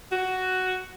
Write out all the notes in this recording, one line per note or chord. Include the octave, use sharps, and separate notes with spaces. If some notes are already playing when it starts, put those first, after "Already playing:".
F#4